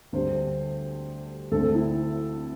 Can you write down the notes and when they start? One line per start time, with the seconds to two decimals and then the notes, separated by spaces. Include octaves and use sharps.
0.12 D2 D3 G3 C5
1.51 D2 D3 A3 C4 A4
1.74 E4